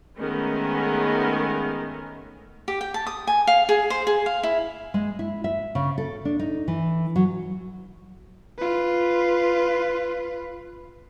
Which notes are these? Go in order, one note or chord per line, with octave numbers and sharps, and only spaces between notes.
D#3 G#3 A3 B3 C#4 A#4
G4
G5
A5
D#6
G#5
F5
G#4
C5
G#4
F5
E4
G#3
E4
E5
C#3
A4
D4
D#4
E3
F#3
F4 B4